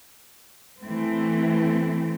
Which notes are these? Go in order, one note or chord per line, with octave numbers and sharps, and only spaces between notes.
E3 A3 C4